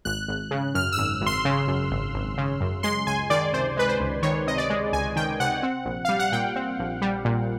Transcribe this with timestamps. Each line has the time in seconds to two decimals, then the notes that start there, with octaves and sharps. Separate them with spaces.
0.05 G#1 F#6
0.28 G#1
0.51 C#3
0.74 F#2 F6
0.92 E6
0.98 G#1
1.21 G#1
1.26 C6
1.45 C#3
1.67 F#2
1.91 G#1
2.14 G#1
2.38 C#3
2.61 F#2
2.83 G#3 C6
3.07 C#2 G#5
3.30 D#3 D5
3.53 C3 C5
3.77 G#3 B4
3.89 C5
4.00 C#2
4.23 D#3 C#5
4.47 C3 D#5
4.58 D5
4.70 G#3
4.93 C#2 G#5
5.16 D#3 G5
5.40 C3 F#5
5.63 C4
5.85 A#1
6.05 G3 F5
6.19 F#5
6.32 A#2 G5
6.56 C4
6.79 A#1
7.02 G3
7.25 A#2